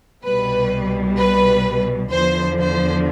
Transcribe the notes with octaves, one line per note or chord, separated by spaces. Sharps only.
C2 B2 G3 B4
B4
E2 D3 F3 C5
C5